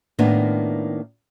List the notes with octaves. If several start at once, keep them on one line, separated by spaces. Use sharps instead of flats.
A2 D#3 A#3 B3 D4